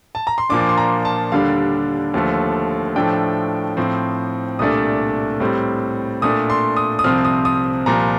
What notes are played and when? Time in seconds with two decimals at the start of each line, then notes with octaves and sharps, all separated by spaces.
0.15 A5
0.27 A#5
0.38 C6
0.49 A#2 F3 A#3 D4 D6
0.60 D6
0.69 C6
0.78 A#5
1.05 A5
1.32 D#2 D3 G3 D4 F5
2.14 D#2 D3 F3 A3
2.96 A2 F3 A3 D4 G5
3.77 A2 F3 C4
4.59 C2 A#2 A3 D4 D#6
5.40 A2 G3 C4
6.22 A#2 A3 D4 D#6
6.50 C6
6.76 D#6
6.99 D#6
7.04 C2 C3 F3 C4 F6
7.25 D#6
7.45 D#6
7.86 C2 A#2 F3 A#5